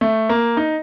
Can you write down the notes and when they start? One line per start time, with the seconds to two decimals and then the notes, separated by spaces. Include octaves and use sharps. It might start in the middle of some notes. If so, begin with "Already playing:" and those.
0.01 A3
0.29 A#3
0.57 D#4